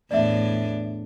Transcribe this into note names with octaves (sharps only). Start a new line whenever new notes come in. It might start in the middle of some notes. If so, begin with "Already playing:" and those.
E2 A2 D4 D5 E5